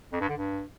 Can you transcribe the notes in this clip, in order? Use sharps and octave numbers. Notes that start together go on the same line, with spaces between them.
F2
G2
D3
G2